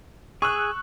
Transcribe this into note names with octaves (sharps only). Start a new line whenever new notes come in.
G#4 C#6 E6 F#6